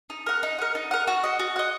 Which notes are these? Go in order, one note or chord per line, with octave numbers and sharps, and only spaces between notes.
D#4
A#4 F#5
D#4
A#4 F#5
D#4
A#4 F#5
F#4
D#5 F#5
F#4
D#5 F#5